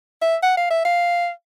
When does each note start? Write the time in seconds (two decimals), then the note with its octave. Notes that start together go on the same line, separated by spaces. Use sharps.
0.22 E5
0.43 F#5
0.57 F5
0.71 E5
0.85 F5